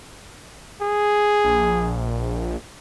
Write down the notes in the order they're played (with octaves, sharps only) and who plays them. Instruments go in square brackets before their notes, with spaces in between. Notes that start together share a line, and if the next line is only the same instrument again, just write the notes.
[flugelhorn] G#4
[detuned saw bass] A#1